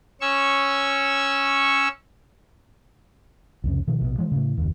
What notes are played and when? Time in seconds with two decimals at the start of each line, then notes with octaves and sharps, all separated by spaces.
0.21 C#4 C#6 E6
3.64 C2 F2 C#3
3.87 B2 D#3 F3
4.01 A#1 B2
4.18 E3 F3 G#3
4.32 A2 C#3
4.58 F#1 D#2